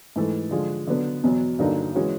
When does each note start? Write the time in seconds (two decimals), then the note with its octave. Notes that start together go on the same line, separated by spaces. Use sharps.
0.16 G#2 E3 A3
0.51 D3 F3 G#3
0.87 D3 F#3 B3
1.23 E2 B2 F#3
1.59 G2 D3 F#3 A#3 D#4
1.95 E3 G#3 C#4 F#4